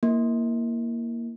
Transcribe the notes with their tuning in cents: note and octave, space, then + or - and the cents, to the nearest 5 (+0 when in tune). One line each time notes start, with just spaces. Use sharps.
A#3 +0 E4 +0